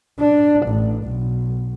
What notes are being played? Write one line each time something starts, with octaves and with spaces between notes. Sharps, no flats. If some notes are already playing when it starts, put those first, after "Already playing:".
D4
A1
B1